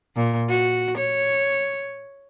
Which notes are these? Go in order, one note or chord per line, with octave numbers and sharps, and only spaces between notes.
A#2
F#4
C#5